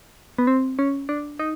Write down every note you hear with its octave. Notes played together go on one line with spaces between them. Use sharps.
B3
C4
C#4
D4
D#4